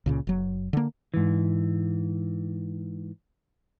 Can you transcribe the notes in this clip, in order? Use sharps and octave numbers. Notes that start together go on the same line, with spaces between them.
C#2 A#2 C#3
F#1 F#3
D3 A#3
G#2 E3